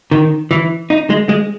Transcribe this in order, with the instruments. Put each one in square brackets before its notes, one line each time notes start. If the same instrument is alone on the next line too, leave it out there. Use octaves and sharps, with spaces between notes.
[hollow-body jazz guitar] D#3
E3
D#4
G#3
G#3